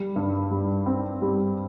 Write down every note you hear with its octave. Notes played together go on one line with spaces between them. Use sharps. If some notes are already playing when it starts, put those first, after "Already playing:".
Already playing: G3
G2
G3
C4
G3